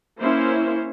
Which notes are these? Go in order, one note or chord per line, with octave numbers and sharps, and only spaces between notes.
A#3 C#4 E4 C5